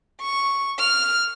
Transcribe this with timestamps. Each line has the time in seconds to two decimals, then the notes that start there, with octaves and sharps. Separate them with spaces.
0.22 C#6
0.79 F6